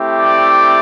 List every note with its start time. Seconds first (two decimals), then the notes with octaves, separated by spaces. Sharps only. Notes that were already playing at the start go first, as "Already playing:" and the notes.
Already playing: A3 C4 E4 G4
0.18 D5